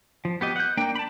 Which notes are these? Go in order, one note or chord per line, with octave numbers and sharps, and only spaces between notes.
F3
B3 G4 D#5
F#5 G6
A#3 D4 G5
A5 B5